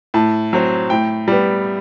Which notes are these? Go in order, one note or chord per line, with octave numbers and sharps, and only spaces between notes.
A2 A5
F#3 C4
A2 G5
G3 B3